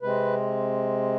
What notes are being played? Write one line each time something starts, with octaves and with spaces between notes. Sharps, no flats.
C3 G#3 C4 B4